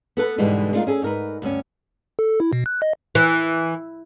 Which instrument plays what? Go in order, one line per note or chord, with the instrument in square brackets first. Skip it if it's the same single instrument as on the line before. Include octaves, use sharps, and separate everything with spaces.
[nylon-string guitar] B3 A4 B4
G#2 B2 D3 E3 G3 G#3
G#3 A3 D4 D#4 F4 A#4
C#4 G#4 A4
G#2 A#4 B4
D2 G2 C#4
[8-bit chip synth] A4
E4
B2
F#6
D#5
[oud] E3